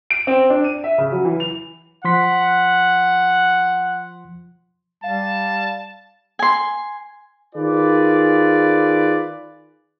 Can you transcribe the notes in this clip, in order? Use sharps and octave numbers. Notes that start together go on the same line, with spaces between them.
D7
C4
D4
D#7
E5
C#3
F#3
E3
F7
F3 F#5 C6 B6
G3 F5 A5
G#5 C6
D#3 F4 G#4 B4 D5